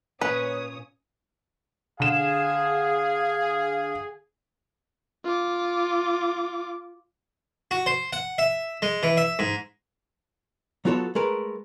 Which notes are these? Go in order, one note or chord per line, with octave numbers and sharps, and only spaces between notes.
A#2 C#4 B4 C#5 D#6
D3 G#4 F5 E7
F4 D6
F#4
C5
F#5
E5
G#3
E3
E5
G#2
F#3 B3 F4 F#4 A4 C#5
G#3 A3 A#4 B4